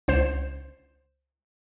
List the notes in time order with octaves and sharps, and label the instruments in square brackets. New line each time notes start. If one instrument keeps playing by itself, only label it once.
[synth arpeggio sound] C#2 C5 G6 E7